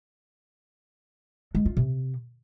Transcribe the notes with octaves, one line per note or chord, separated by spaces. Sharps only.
G#3
F4
C3